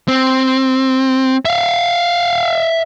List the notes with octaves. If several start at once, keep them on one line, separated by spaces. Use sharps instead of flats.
C4
E5 F5